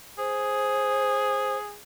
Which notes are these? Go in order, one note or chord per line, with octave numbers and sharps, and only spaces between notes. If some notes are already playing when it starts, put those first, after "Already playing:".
G#4 C5